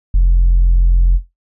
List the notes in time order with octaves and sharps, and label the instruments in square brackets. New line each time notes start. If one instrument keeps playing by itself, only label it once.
[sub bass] F1